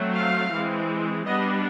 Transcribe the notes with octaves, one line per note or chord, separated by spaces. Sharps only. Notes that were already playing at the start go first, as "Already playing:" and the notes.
Already playing: F#3 A3 C4
F5
E3 G#3 C4
G3 B3 D4 D#5